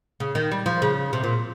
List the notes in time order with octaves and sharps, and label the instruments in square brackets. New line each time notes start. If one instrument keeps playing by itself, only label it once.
[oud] C#3
D#3
G3
F3
C#3
C3
A#2